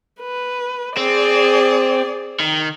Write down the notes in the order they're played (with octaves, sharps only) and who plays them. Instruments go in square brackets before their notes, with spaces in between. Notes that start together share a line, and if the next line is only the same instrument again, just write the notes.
[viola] B4
[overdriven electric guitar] C4 [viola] G#4 D5
[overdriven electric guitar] D#3